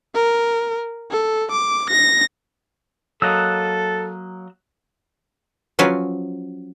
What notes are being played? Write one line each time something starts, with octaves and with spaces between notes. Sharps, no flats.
A#4
A4
D6
A#6
F#3 A#3 A4 D#5 E6 F#6
F3 F#3 C#4 F4 B4